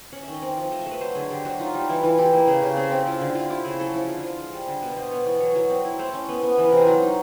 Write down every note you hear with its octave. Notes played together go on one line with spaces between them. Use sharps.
C#4 F#5
D#3 E5
D#5
C4 D5
F3
A3 D#5
E5
A3 B4
F#3 C5
D3 G#4
D3 G4
F#3 F#4
D#4 F4
G3
E3 E4
E3 F4
E4 G4
A#3
C#3 G#4
C#3 G4
C4 G#4
C4 G4
E4 F4
D3
C4 F4
E4 G4
C#3 G#4
F#3 A4
F3 E4
D3 F4
F3 F4
G#3
G3
D3
B2 B4
B2 C5
B3 C#5
E3 D5
F#3 C#5
F#3 C#5
C4
E4
A3 C5
C#4
B3
B3
E3 B4
C3 A#4
C5
F#3
D#4